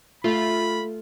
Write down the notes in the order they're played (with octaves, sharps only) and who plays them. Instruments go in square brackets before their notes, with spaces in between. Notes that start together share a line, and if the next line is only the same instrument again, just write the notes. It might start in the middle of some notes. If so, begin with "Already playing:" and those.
[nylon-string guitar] A3 [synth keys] F4 [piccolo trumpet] B5